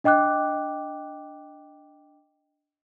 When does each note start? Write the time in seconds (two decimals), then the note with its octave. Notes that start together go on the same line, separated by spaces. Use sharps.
0.04 D4 D#5 G5 D6 F#6